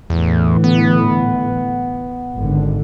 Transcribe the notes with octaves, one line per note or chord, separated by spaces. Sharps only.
E2 A2 D3 E3
B3
G#1 D3